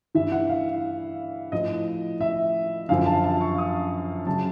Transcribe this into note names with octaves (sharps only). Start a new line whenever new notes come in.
G2 E3 E5
F#5
F5
A2 F3 D#5
E5
F#2 D3 F3 F5
A5
A5
C#6
D#6
C#3 F#3 A5